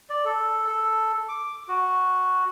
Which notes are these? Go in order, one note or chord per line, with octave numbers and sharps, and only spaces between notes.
D5
A4
A4
D6
F#4